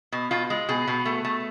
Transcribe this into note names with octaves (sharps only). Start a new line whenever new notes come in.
B2
B2 F4
G#3
B2 G#4
B2
A3
A3